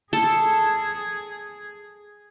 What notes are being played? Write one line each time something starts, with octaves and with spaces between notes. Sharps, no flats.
G#4 A4